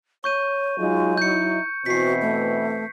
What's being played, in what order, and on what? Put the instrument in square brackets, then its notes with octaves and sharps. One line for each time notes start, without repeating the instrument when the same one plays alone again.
[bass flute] C#5 [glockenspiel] C#6 G6 D#7
[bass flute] F#3 [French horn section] G#3 D#4 F4
[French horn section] D#4 E4 [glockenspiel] G6 C#7
[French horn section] B2 E3 C4 [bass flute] F#4 [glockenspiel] B6 C7
[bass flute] A3